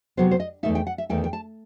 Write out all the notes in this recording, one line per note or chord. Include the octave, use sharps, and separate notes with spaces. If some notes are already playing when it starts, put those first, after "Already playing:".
C3 F#3 B3 C5
C5
D#5
D#3 A3 D#4 E5
E2
G5
F#5
E5
E2 D#3 A3 D#4 G5
G5
A5